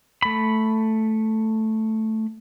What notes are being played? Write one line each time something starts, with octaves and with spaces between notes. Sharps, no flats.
A3 B5